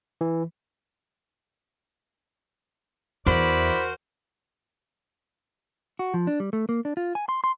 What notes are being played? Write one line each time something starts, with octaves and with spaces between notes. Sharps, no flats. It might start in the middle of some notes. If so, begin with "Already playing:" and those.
E3
E2 E4 F#4 A#4 C5 D5 B5
F#4
F3
D4
G3
A3
A#3
D4
F4
G#5
C6
C6